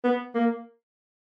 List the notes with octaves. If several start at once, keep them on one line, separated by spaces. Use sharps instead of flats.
B3
A#3